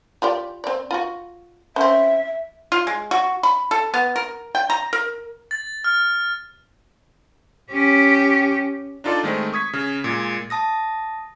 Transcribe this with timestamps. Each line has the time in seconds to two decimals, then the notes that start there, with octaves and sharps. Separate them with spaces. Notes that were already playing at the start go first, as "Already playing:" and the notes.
0.22 F4 G4 D5
0.64 C4 D5
0.91 F4 F#4
1.76 C4 C#4 E5
2.72 F4
2.87 G#3
3.11 F#4
3.43 B5
3.71 A4
3.94 B3
4.16 A#4
4.55 G5
4.70 A#5
4.93 A#4
5.51 A6
5.84 F6
7.72 C#4 G4
9.04 D4 D#4 F4 A4 D5
9.23 D#3 G#3 A3 C4 D#4
9.53 C#6 D#6 G#6 B6
9.73 C#3
10.04 A#2 G#3
10.50 A5 D#6 A#6